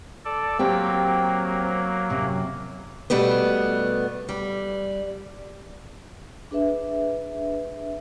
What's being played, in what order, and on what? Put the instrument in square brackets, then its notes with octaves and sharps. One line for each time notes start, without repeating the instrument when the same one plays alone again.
[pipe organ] A4 D5
[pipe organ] F#3 A#3 [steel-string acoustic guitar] C4 G4
[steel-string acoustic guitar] F#2 C3
B2 G3 A3 B3
G3
[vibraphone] D4 G#4 B4 E5